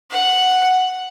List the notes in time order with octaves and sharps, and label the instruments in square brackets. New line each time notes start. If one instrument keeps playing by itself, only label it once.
[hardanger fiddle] F#5